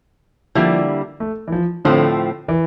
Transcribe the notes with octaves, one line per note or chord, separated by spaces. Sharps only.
D3 F3 G3 A#3 E4
A3
E3
F3
A2 D3 F3 A3 C4
E3